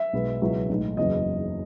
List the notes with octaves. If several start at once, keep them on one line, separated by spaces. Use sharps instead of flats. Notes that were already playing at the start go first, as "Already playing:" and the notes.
Already playing: E5
B1 B2 G#3 B3
C#2 B2 F#3 B3 E4
B1 A2 G#3 D#4
F#1 E2 C#3 F#3 D#5